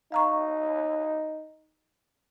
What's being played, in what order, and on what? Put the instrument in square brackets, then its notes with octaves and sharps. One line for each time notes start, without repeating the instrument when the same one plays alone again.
[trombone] D#4 [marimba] F5 A#5 C#6